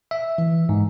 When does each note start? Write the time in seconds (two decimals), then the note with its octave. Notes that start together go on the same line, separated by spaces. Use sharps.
0.11 E5
0.38 E3
0.69 G#2